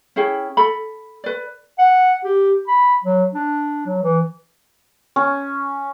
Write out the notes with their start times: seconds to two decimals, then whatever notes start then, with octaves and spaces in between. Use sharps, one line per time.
0.16 C#4 E4 G#4 G5
0.57 A4 B5
1.24 B4 D5
1.79 F#5
2.24 G4
2.68 B5
3.04 F#3
3.34 D4
3.86 F#3
4.03 E3
5.16 C#4